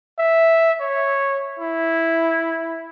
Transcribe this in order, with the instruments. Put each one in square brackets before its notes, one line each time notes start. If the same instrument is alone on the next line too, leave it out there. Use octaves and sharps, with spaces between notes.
[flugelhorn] E5
C#5
E4